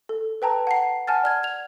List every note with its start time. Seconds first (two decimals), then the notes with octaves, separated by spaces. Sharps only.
0.09 A4
0.42 B4 G5 A5 A#5
0.67 F#5 A5 C7
1.07 F#5 G#5 A5 F6 A6
1.24 D5 F6 G#6
1.43 G#6 F7